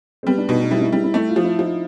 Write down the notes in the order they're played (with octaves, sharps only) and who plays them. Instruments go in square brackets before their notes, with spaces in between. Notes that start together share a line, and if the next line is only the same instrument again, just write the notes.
[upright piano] C4
[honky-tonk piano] G3 [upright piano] B3
[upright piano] D4
[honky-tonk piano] B2 [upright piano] D#4
[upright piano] D#4
[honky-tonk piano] G3 [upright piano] E4
[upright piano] E4
[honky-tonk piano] G3 [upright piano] E4
[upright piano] E4
[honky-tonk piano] A3 [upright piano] E4
[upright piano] F4
[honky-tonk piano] F3
[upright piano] E4
[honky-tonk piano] F3 [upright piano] D#4